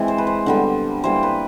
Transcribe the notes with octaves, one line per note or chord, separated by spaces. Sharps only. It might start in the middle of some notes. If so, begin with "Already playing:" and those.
Already playing: E3 G#3 C4
C5
B4
C5
D3 G3 B3
E3 G3 A#3 C5
B4